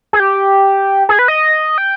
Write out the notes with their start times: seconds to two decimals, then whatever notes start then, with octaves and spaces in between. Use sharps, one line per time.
0.13 G#4
0.20 G4
1.09 G#4
1.19 B4
1.28 D#5
1.78 G5